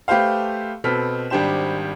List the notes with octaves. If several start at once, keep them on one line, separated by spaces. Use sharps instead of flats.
A3 G4 B4 C5 F5
B2 C4 A4 B4 F6 B6
G#1 G3 D4 G4 C5 E7